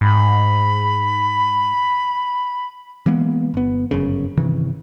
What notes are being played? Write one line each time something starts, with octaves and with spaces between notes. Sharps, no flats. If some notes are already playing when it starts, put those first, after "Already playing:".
G#2 B5
E3 G#3 A#3 B3
G1 B3
G1 F#2 C#3
G1 C3 D#3 E3